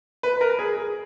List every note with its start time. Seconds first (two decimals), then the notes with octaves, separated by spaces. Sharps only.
0.23 B4
0.41 A#4
0.59 G#4
0.77 G#4